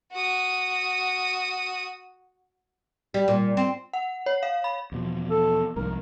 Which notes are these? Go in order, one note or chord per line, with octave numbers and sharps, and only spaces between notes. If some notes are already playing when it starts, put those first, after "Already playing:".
F#4 D#6
G3
A#2
C4
F#5
C#5
F5
B5
E2 B2 F3
A4
C2 F2 G#2 A#4